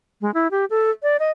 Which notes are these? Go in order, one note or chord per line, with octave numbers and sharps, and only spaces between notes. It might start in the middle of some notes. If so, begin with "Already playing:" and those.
G#3
E4
G4
A4
D5
D#5